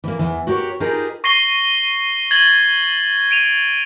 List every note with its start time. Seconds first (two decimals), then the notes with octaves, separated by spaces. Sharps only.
0.04 E3 A#3
0.19 E2 E3
0.47 F#4 G4 A#4 C#5
0.80 D#4 F4 G4 G#4 A#4 B4
1.24 C#6 A#6 C7 D#7 G7
2.31 G#6 A6 F#7 G7
3.31 D7 D#7 F7